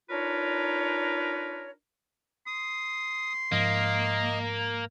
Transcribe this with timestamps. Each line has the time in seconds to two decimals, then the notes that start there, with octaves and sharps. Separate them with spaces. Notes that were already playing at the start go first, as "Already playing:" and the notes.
0.10 D4 D#4 F4 A#4 B4 C#5
2.47 C6 D#6
3.52 G#2 F3 A#3 D#5